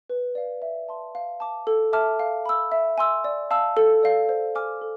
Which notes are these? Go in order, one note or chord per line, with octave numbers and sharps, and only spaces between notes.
B4
D5 F5
E5
A5 C6
F5
A5 D6
A4
E5 A5 D6 F6
F5
B5 E6
E5
G#5 C6 E6
D5
F5 A5 E6
A4
D5 F5
C5
G#5 D6 F6
A4